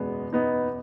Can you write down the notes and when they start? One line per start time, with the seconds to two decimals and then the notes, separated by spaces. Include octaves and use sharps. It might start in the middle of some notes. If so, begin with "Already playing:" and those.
Already playing: F#1 E2 B2 G#3 B3
0.33 B3 D#4